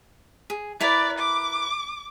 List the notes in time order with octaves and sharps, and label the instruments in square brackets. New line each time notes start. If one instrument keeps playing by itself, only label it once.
[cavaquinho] G#4
[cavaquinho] E4 A#4 B4 [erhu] D5
[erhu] D6